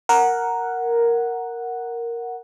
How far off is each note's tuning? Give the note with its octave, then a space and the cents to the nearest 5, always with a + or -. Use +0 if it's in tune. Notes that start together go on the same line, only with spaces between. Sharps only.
A#4 +0 F#5 +0